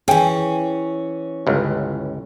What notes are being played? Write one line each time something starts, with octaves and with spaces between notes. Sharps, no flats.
E3 C#4 G#4 G5 G#5
G1 C#2